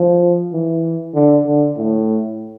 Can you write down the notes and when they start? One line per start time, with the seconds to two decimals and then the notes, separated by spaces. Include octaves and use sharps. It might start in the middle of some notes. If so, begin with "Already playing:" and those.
Already playing: F3
0.53 E3
1.15 D3
1.46 D3
1.77 A2